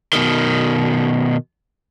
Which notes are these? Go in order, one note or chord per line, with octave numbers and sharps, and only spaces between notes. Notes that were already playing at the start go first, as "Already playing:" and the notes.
B2 D#3